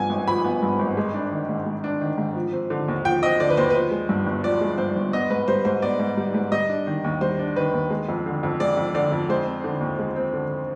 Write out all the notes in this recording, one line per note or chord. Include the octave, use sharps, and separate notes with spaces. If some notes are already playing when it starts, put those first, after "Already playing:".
Already playing: G2 F3 B3 G#5
G#1
F3 B5
B3
G2
G#1
G#3
D4
D#3
G#2
G#3
D4
D#3
G#2
F3
C4
D3
D#2
F3 G5
C4 D#5
D3 D5
B4
D#2 C5
B4
F3 C5
G#3
G2
G1
F3 D5
G#3
G2 C5
G1
B3 D#5
G#2 B4
G3 C5
G#2 C5
B3 D5
G#2
G3
G#2
G3 D#5
D4
D#3
D#2
G3 C5
D4
D#3 B4
D#2
G#3
F2
D3
F2
G#3 D5
F2
D3 D5
F2
G#3 C5
C4
D3
D#2
G#3
C4
D3